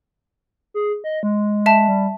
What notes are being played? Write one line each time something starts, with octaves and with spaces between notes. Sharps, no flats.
G#4
D#5
G#3
E5 A5
G3